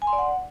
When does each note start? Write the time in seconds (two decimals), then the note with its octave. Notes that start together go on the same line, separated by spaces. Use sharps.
0.02 G#5
0.07 C6
0.13 D5
0.18 F#5